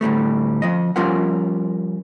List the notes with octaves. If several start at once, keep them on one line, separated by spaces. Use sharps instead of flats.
D2 A2 G3 A3
F3 D#5
F3 G3 C#4 F4 A#4 F#5